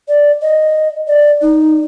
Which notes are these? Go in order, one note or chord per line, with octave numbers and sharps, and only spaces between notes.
D5
D#5
D5
D#4